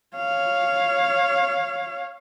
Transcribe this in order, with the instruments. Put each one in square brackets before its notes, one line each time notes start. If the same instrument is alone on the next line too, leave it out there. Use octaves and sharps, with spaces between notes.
[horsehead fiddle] C#5 F5